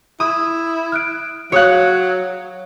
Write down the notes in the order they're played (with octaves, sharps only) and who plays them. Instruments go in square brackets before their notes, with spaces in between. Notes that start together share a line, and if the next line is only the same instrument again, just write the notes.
[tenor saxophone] E4 [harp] D#6
[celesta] F6 F#6 D7
[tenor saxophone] F#3 [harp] C#5 F#6 [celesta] F5 D#6 C#7